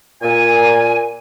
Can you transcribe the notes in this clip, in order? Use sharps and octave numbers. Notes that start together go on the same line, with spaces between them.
A#2 G#5